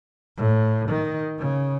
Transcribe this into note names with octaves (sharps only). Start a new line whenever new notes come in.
A2
D#3
C#3